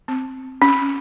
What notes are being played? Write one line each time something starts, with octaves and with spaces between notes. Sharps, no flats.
C4
C#4